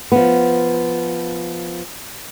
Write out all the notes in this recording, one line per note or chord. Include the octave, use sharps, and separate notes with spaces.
F3 B3